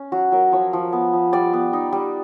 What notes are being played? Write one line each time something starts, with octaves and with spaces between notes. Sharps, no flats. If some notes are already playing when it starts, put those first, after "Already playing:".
Already playing: C#4
F#3 F#4
F#3 A#4
F3 C#5
F3
B3
F3
G3 D5
B3
D#4
G3